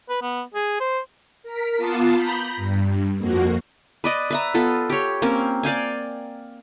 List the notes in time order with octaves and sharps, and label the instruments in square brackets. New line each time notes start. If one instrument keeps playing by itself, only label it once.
[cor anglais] B4
B3
G#4
C5
[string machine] A#4 B6
B3 F4 A5 D6 D#6 C7
A#5 B5 G6
G2
F2 A#3 F#4
[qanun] B4 D5 D#5
B4 E5 A#5
B3 F4 A4 B5
G4 C#5
A#3 C4 C#4 A#4
D5 F5 G5 G#5